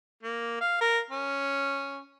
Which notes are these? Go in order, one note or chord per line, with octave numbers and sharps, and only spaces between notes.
A#3
F5
A#4
C#4